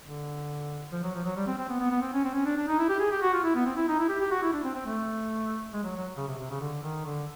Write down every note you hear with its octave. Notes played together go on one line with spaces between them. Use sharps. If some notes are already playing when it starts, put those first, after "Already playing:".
D3
F3
F#3
F3
F#3
G3
C4
C4
B3
B3
B3
C4
C#4
C4
C#4
D4
D4
D#4
E4
G4
G#4
G4
F#4
F4
E4
B3
C4
E4
D#4
E4
G4
G4
F#4
E4
D4
C4
C4
A3
G#3
F#3
F#3
C#3
C3
C3
C#3
D3
D#3
D3